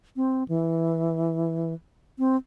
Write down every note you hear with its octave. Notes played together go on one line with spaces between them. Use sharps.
C4
E3
C4